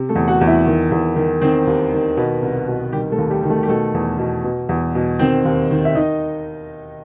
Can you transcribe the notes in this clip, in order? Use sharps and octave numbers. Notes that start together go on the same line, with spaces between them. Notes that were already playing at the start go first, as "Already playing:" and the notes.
Already playing: C3
A3 A4
E2
F#4 F#5
E2
E4 E5
D#3
E2
D#3
D#3 C4 C5
D#2
D#3
B2 B3 B4
C2
B2
D#3 G3 G4
A3 A4
D#2
G3 G4
D#3
A3 A4
G4
B2 A3 A4
E2
B2
B2
E2
B2
D#3 C4 C5
D#2
D#3
E5
D#3 D#4 D#5